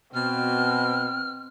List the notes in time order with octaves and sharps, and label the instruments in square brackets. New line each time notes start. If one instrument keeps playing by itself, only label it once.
[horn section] B2 [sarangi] C4 [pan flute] F6